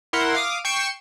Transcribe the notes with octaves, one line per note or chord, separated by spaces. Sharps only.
E4 A#4 F#5 C6
F5 D6 D#6
G5 C#6 C7 C#7 E7